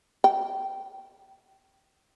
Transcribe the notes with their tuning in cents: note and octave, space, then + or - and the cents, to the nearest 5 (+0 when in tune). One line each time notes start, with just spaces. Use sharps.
G5 -10